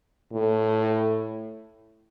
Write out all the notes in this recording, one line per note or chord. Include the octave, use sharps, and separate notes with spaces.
A2